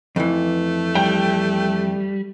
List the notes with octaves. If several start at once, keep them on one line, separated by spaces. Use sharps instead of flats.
F2 E3 A3
G3 G5